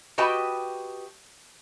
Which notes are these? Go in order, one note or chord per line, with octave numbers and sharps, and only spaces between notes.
F#4 G4 B4 D#5 G5 A5